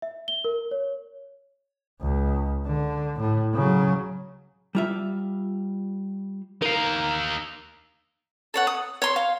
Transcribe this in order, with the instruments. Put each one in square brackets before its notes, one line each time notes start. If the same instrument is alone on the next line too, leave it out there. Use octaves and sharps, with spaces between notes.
[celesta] E5
G7
A#4
C#5
[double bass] C#2
D3
A2
C#3 F#3
[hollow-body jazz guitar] G3 F4 E5
[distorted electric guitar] D#4 F5 [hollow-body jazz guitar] A#4
[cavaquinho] A4 C#5 F#5
D#6
C#5 C6
F5